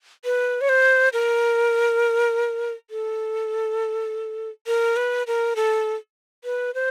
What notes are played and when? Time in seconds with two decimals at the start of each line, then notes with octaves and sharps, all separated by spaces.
0.25 B4
0.61 C#5
0.69 C5
1.13 A#4
2.90 A4
4.67 A#4
4.96 B4
5.27 A#4
5.56 A4
6.44 B4
6.75 C5